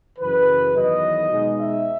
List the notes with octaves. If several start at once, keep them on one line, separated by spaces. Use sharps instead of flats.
F#2 C#3 E3 B4
E2 D#3 F#3 D#5
B2 G#3 D#4
E5